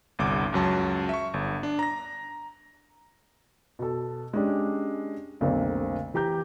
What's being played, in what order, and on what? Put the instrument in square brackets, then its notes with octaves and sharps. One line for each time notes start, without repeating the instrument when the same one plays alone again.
[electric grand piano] G1 C2 D6
C#2 F#2 F#3 A5
E5 C#6
G1
D4
A#5 A#6
[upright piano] B2 A4
G#3 C#4 D4 G4
F1 B1 D3 A#3 C4
E3 G4 A#5 G6